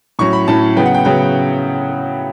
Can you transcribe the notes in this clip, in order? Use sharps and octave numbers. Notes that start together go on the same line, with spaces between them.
A2 F#3 C#4 C#6
B5
A2 F#3 C#4 A5
C#3 F#3 B3 G5
F#5
G5
C#3 F#3 B3 G5